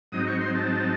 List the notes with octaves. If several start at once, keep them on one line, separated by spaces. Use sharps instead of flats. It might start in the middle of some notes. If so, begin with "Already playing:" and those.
G#2 F#3 C4 D#4 D#6
C#6
C6
A5